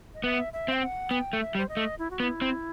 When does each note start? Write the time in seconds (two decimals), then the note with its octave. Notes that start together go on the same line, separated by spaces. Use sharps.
0.14 D#5
0.24 B3 E5
0.53 E5
0.68 C4 G5
0.82 F#5
1.11 B3 G5
1.33 A3
1.41 E5
1.55 G3
1.58 C5
1.69 D#5
1.77 A3
1.99 E4
2.11 F#4
2.20 B3
2.23 E4
2.42 C4